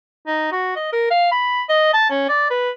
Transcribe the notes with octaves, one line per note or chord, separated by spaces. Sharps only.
D#4
F#4
D#5
A#4
F5
B5
D#5
A5
C#4
D5
B4